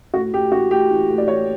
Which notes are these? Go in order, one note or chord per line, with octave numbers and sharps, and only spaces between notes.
A2 F#4
A2 G4
E3 F#4
A2 G4
E3
A2
D5
E3 C#5